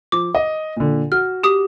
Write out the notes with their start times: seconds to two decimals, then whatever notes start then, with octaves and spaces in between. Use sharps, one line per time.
0.12 F3 D6
0.35 D#5
0.77 A#2 D3
1.12 F#4 F6
1.43 G4 D#6